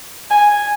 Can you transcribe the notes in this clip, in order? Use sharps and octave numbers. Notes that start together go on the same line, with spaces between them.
G#5